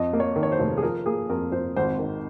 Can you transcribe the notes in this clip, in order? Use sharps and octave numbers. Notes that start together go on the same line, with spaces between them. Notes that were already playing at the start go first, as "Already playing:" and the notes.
Already playing: F2 D#5
A#3
C#5
D#3
C#5
C5
F1
G#4
F3 A#4
A#3 G#4
F2 A#4
F2 C5
G#1 C5
D#3